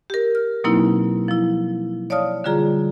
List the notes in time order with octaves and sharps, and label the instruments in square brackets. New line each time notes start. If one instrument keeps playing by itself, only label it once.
[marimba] G4 A#4
F6
B2 F#3 A#3 C4 D#4 E4
F3 E4
C#5 D5 F5 A5 D#6 F6
D3 G3 F4 G#4 A#5